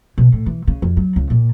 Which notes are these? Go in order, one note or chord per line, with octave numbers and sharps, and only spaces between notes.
B2
A2
E3
C#3
F2
F#3
C#2
A#2